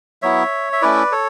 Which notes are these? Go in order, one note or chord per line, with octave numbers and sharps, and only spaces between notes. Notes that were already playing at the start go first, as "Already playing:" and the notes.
F#3 B3 E4 C#5 E5
E5
A3 C#4 E4 B4 D5
A4 C#5